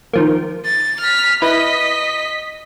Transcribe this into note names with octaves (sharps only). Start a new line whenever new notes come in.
D#3 F3 A#3
A6
F6 B6
E4 B4 D#5 B6